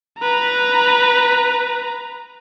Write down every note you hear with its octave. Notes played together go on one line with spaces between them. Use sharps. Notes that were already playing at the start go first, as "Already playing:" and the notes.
B4 A#5